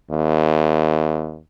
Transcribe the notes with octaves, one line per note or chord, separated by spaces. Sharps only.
D#2